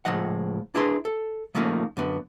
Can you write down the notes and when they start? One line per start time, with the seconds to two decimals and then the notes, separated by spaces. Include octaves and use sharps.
0.05 C#2 F#2 A2 F3 D#5 F#5
0.75 D4 E4 G#4 B4 C6
1.05 A4
1.55 C#3 F3 A3 A#3 C#4 D#4
1.97 F#2 D3 B3